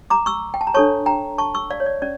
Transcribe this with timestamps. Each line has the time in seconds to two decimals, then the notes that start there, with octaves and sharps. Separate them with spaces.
0.10 A#5 D6
0.26 C#6 E6
0.54 G5
0.61 A5
0.67 A#5
0.74 D4 A4 C#5 A5 C#6
1.06 G5 A#5
1.38 A5 C#6
1.54 C#6 E6
1.70 D5 F5
1.80 C#5
1.86 D5
2.02 C#4 D5